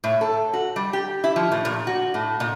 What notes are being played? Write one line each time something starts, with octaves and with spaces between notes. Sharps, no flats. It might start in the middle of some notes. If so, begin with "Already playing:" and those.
A2
A4
F#4
G3
G4
E4
F3
A2
A#2
F#4
A2
A#2